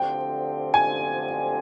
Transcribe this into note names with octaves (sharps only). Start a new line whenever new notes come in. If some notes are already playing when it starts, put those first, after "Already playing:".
Already playing: D2 D3 F3 C4 G4 G5
G#5